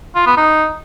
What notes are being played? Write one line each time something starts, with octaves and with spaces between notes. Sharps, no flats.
F4
B3
D#4